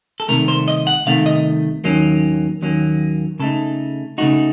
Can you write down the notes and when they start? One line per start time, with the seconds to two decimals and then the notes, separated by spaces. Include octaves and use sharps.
0.20 A4
0.28 C2 C3 D#3 A3 A#4
0.48 C5
0.68 D#5
0.87 F#5
1.06 C2 C3 D#3 A3 F5
1.26 D#5
1.84 D#2 D#3 F#3 A#3 C#4
2.62 D#2 D#3 F#3 A#3 C#4
3.40 C#3 A3 D#4 A4
4.18 C#3 A3 D#4 F#4